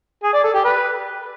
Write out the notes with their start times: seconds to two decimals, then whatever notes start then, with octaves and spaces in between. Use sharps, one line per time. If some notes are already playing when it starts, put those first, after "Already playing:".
0.23 G#4
0.33 D5
0.44 A4
0.54 G4
0.64 B4